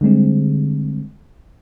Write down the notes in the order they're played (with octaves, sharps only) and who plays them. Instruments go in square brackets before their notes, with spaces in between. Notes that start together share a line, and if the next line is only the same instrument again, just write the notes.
[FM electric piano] D3 G3 G#3 C4